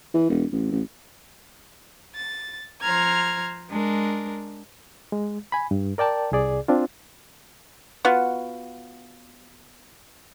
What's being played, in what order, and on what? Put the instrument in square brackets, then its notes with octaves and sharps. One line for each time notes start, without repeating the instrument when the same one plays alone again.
[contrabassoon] E3
E1
A1
A1
[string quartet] A6
F3 C5 A#5 F6 G#6
G#3 D4 A#4
[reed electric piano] G#3
G#5 B5
G2
A#4 D5 G5 A5
C2 C3 G#4 D5
C4 D4 F4
[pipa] B3 F4 F#4